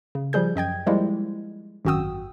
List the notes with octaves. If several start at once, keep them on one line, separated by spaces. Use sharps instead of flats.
C#3
F3 G3 G#4 G6
F#2 D#5 G5 G#6
F3 G3 G#3 A#3 E4
G#1 F#2 F#4 G5 D#6 E6